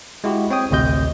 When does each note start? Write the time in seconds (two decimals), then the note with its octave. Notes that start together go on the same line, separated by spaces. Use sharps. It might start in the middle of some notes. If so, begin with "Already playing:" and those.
0.24 G#3 E4 F#4 G4
0.50 C4 C#5 G5 D#6
0.71 A1 D2 C3 D#5 G6